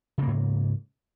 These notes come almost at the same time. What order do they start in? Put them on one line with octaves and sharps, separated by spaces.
C#3 A#3 G#2